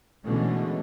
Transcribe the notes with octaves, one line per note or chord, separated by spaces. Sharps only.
B2 D3 E3 G#3 A3 C#4